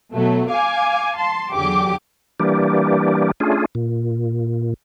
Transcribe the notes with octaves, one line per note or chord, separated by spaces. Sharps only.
B2 F#3 A3
F5 G#5 D6
A5 C6
E2 D3 F#3 G4 G#4 D6
E3 G3 A#3 D4 G4
A3 C#4 D4 F4 G#4
A#2